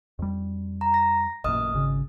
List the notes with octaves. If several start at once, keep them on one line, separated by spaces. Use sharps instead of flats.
F2 G3
A#5
A#6
A1 F#2 A#2 D#5 D#6 F6
G#1 C#3